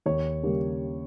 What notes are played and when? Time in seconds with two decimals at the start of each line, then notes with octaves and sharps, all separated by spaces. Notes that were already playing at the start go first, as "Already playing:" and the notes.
0.06 D#2 C#5
0.43 C#3 G3 A#3